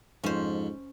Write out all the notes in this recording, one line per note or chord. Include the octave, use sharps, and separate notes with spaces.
F2 G#2 C#4 C5